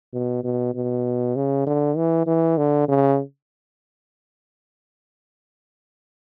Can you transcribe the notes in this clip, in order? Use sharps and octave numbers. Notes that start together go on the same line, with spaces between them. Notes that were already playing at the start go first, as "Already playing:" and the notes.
B2
B2
B2
C#3
D3
E3
E3
D3
C#3